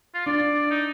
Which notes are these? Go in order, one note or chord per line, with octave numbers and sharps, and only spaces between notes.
F4
D4 D5
D#4